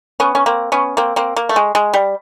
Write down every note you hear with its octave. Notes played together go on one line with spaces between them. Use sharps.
B3 C#4
C#4
A#3 C4
B3 C#4
A#3 C4
A#3 C4
A#3
A3
G#3
G#3
G3